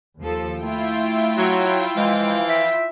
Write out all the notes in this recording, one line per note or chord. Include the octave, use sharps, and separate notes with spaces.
D#2 F3 A4
A3 E4 F4 G5
F#3
E3 F3 G#3 F5
E5